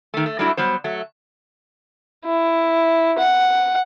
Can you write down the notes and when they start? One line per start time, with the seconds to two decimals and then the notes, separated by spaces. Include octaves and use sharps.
0.14 D#3 A3
0.26 A3
0.39 F#3 G3 A3 D4 E4 F#4
0.57 F#3 G3 B3 C5
0.84 F#3 A3
2.26 E4
3.18 F#5